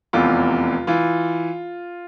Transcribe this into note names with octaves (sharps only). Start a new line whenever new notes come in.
F1 E2 C3 F4
E3 F4